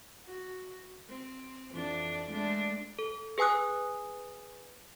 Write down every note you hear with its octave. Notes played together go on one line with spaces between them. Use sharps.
F#4
C4
F2 E3 D4
G#3 A3 D4
A4
G#4 B4 G#5 D#6 F#6